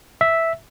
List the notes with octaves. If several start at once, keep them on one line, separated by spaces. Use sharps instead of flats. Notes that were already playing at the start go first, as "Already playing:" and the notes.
E5